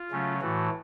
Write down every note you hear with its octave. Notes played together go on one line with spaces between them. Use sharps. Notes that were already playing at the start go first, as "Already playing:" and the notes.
Already playing: F4
C#3 F#3 A3 C#4
A2 E3 A3 F#4